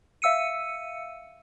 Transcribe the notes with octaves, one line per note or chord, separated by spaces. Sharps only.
E5 F5 E6 C#7 D#7